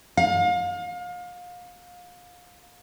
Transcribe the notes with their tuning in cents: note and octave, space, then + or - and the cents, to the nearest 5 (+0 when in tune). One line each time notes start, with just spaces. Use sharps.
F5 +30